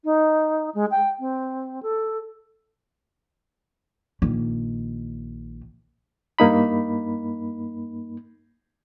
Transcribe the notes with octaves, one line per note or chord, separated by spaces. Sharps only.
D#4
G#3
G5
C4
A4
A#1 D#3
G2 A#3 D#4 B5